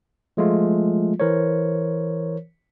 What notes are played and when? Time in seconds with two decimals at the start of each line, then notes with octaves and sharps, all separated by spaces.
0.37 F3 G#3 A3 F4
1.20 E3 A#4 C5 C#5